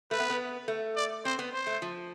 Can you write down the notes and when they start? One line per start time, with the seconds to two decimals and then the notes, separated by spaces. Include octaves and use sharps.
0.11 A3 B4
0.20 B3
0.30 B3
0.68 A3
0.96 D5
1.25 C4 C5
1.39 B3
1.53 C5
1.67 A3
1.82 F3